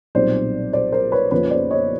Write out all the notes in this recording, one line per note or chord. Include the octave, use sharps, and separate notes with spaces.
B1 A#2 G3 C4 C5 D5
C5 D5
A#4 C5
B4 C#5
F2 C#3 F3 A#3 C#4 B4 C#5
C5 D5
C#5 D#5